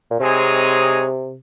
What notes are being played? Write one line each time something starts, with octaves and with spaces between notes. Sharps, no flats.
A#2
C3 G#3 C4 D#4 G#4 C#5